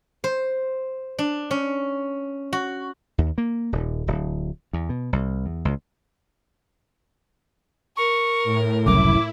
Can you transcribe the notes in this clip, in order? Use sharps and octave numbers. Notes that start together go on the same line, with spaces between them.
C5
D4
C#4
F#4
D#2
A#3
D#1
D1
E2
B2
C2
E2
C#2
A#4 C#6
A2
F#1 C2 F#2 E4 D6